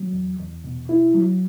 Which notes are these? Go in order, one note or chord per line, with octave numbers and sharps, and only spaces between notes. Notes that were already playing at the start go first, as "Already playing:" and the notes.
Already playing: F#3
E2
E2
B2
E4
F#3